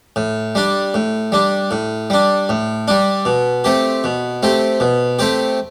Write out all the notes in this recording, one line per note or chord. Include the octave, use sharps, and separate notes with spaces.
A2
G3 D4
A2
G3 D4
A2
G3 D4
A2
G3 D4
B2
A3 C4 G4
B2
A3 C4 G4
B2
A3 C4 G4